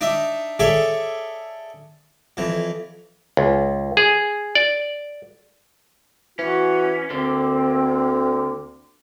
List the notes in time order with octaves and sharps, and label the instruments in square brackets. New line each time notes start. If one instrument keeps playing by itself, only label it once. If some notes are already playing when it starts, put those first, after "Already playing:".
[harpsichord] D4 D#4 D#5 E5
G#4 A4 C#5 D5 E5
F2 E3
[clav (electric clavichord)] C#2
G#4
D5
[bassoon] E3 [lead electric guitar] C#4 [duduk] F#4
[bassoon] D2 [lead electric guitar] D3 A#3 [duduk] C4